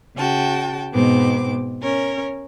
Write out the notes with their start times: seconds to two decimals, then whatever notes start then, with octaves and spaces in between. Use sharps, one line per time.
0.17 C#3 F#4 G5 A5
0.92 G#2 B2 B3 C4 D6
1.82 C#4 A#4 C#5